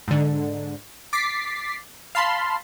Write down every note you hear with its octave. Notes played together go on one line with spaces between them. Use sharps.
G#2 D3
D6 A6 B6 C7
F5 A5 B5 C6